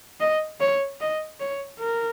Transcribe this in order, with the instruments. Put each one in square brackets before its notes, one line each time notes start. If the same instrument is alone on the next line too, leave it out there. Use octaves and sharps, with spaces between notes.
[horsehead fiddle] D#5
C#5
D#5
C#5
A#4